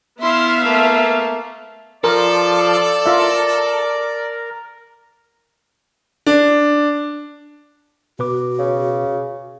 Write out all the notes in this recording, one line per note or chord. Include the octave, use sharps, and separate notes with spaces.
B3 E4 E5 F5 C6
A3 A#3
F3 F4 A4 A#4 D5
F4 A#4 E5
D4
B2 F#4 B4 D6
C#3